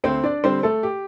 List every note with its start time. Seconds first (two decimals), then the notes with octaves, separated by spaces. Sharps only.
0.04 D2 C4 C5
0.24 D4 D5
0.44 D3 G3 C4 C5
0.63 A3 A4
0.83 G4